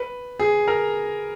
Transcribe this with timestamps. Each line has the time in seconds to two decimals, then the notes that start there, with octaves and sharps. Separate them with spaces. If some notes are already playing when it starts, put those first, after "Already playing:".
Already playing: B4
0.40 G#4
0.68 A#4